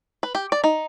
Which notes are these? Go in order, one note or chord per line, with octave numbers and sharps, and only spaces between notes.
B4
G4
D5
D#4